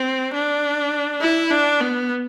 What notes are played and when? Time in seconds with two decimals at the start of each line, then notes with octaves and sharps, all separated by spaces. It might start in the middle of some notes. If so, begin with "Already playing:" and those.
Already playing: C4
0.34 D4
1.21 E4
1.51 D4
1.81 B3